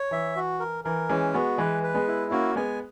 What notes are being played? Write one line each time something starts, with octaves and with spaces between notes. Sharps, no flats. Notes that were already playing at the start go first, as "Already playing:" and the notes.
Already playing: C#5
E3 E5
F#4
A#4
E3 A#4
E3 G#3 C#4
G#3 B3 F#4
E3 G#3 B4
B4
G#3 B3
E4
A#3 C#4 F#4
G#3 B3 G#5